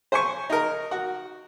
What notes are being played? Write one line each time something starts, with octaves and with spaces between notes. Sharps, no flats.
C5 G#5 C#6
D#4 A#4
F#4